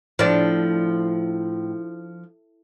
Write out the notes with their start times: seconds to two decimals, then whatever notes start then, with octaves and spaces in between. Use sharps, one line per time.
0.19 A2 F3 D4